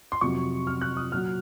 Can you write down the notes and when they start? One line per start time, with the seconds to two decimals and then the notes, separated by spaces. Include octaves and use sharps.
0.12 C6
0.21 F2 C3 F#3 C#6
0.67 F6
0.81 F#6
0.97 D#6
1.12 A#2 F#3 F6